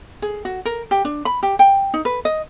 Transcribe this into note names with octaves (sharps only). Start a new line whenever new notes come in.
G#4
F#4
A#4
G4
D4
B5
G4
G5
D#4
B4
D#5